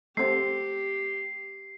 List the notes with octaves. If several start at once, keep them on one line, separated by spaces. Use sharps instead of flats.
A3 C4 G4 C7